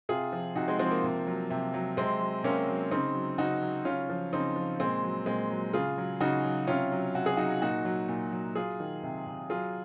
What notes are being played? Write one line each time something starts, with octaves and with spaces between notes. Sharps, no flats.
C3 F4 G#4
F3
C3 D#4 F#4
G#3 C4
F3 G#3 C4
A#3
C3
F#3
C3
F#3
C3 G#3 C4
F#3
C3 A#3 C#4
F#3
C#3 C4 D#4
F#3
C#3 D#4 F#4
F#3
C#3 C#4 F4
F3
C#3 C4 D#4
F3
A#2 G#3 C4
F#3
A#2 G#3 C4
F#3
C#3 F4 G#4
F#3
C#3 D#4 F#4
F#3
C3 C#4 F4
F#3
C3 F#4
G#4
F#3 D#4 F#4
A#2 D#4 F#4
F#3
A#2
F#3
F#3 F4 G#4
D#3
C3
C3
F#3 F4 G#4